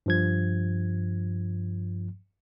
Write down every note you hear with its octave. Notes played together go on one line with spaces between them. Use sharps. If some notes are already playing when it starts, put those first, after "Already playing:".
G2 F3 G#6